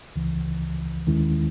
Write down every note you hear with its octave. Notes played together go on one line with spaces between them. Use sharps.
C#2 C#3 E3
D#2 D#3 G#3 C#4 E4